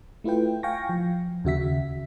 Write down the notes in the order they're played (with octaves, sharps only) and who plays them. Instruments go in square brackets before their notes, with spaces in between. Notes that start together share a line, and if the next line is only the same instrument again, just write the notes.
[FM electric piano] A3 E4 F4 B4 G5
F5 G5 G#5 C#6 A#6
F3
D#2 C#3 F#4 E5 B6